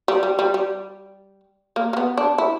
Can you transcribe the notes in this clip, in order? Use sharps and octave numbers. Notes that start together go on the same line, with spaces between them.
G3
G3
G3
G3
A#3
A#3
B3
D4
E4